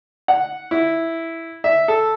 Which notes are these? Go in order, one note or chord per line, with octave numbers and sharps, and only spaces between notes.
F#5
E4
E5
A4